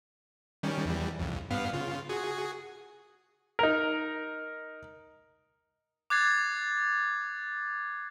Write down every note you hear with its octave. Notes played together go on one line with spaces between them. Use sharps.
D#3 G3 C#4
E2 E3 G3
C2 F2
G2 B3 F5
C#3 F4
F#4 G#4
D#4 A#4
D6 F#6 G#6 A6 C7